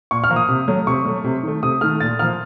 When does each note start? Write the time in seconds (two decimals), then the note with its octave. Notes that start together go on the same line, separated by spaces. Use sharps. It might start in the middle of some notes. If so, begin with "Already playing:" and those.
0.11 A#2 C#6
0.24 F6
0.30 F3 A#3
0.36 D#6
0.49 C3
0.68 F#3 A3
0.87 C3 C#6
1.06 F#3 A3
1.24 C3
1.43 D#3 A3
1.63 C3 D#6
1.81 D#3 A3 F6
2.00 A#2 A6
2.19 F3 A#3 F6